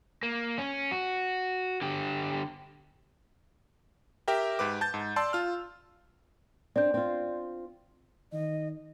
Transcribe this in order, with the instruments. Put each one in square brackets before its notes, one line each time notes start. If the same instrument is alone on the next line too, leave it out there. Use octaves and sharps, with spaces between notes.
[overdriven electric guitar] A#3
C#4
F#4
D3 G4
[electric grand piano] G4 A#4 E5 G5
G#2 G4 B4 D6
A5 G6 A6
G#2
D5 A5 C6 E6
F4 F6
[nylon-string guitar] C4 D4 [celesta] D5 G6
[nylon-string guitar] C4 F4
[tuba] D#3 [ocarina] D#5